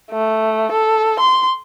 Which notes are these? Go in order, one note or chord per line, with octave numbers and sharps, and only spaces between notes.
A3
A4
C6